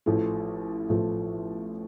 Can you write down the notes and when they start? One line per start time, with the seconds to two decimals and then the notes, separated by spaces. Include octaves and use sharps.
0.06 A1 A2 F3 A3
0.89 A1 A2 F3 A3